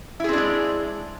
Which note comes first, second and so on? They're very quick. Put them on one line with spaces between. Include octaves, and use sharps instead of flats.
E4 G#4 C4 D4 G#3